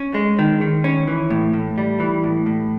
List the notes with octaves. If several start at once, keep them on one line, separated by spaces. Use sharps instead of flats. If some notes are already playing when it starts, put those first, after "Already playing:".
Already playing: C#4
G#3
D#3
D#3
C#4
E3
A2
A2
G3
E3
A2
A2